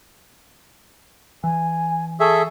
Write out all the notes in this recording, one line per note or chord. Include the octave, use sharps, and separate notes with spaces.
E3 G#5
G#4 A4 E5 C#6